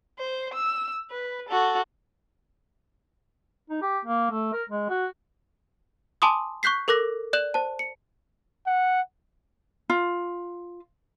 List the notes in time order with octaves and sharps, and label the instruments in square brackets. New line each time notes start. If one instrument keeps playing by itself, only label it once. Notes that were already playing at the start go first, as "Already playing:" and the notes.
[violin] C5
E6
B4
F#4 A4
[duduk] D#4
G4
A#3
A3
A#4
G#3
F#4
[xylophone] G#5 A5 B5 C6 D6 D#6
C#6 F#6 G6 B6 C7
A4 A#4 D6 F#6 A#6
D5 F#6 E7 F#7
C5 A5
C#7
[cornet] F#5
[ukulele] F4